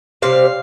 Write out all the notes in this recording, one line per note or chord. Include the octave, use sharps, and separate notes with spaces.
C3 G3 C4 F5